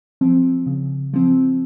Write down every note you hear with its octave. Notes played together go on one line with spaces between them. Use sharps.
F3 C4
C#3
F3 C4